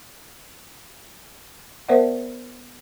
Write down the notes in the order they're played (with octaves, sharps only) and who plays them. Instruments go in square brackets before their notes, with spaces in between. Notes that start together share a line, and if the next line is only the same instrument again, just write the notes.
[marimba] B3 A#4 C5 D5 E5 F#5